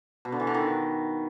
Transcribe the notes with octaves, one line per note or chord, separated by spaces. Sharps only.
B2
D3
E3
D3
D#3